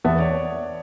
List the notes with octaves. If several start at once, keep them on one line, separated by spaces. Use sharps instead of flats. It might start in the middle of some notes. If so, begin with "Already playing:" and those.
E2 B3 E5 F#5 A5
C#5 D5